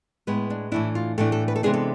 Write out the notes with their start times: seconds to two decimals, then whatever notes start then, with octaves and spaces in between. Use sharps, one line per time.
0.27 A2 G#3 B3 B4
0.50 D4
0.72 A2 E3 A3 D4 E4
0.95 F4
1.18 A2 E3 A3 D4 A4
1.32 A4
1.48 B4
1.56 A4
1.63 C3 E3 G#3 B3 D4 G#4
1.74 A4